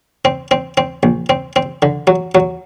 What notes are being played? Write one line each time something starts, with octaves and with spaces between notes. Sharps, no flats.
C4
C4
C4
A#1
C4
C4
D3
F#3
F#3